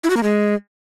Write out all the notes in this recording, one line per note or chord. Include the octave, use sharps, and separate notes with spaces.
E4
F#4
A#3
G#3